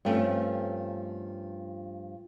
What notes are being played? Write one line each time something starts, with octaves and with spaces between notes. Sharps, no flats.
G2 F3 A3 C4 C#4